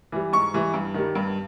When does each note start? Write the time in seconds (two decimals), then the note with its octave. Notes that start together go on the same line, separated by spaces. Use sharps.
0.12 E3 G3
0.33 G#2 C#6
0.54 E3 G3
0.74 G2
0.94 D#3 G3
1.15 G2